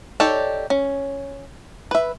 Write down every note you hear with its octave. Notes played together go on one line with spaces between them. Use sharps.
D#4 G4 A4 C#5 D5
C#4
B4 E5